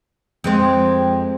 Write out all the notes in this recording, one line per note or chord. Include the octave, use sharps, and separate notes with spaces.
F2 G#3 C4